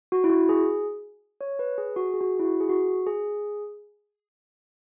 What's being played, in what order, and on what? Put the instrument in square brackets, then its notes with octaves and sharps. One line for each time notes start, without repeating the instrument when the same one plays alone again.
[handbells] F#4
E4
F#4
G#4
C#5
B4
G#4
F#4
G#4
F#4
E4
F#4
G#4
F#4
G#4